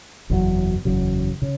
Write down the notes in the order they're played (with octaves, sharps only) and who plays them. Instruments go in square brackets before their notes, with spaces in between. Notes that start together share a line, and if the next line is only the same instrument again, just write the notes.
[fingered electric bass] F#1 E2 C#3 F#3
F#1 E2 C#3 F#3
C#3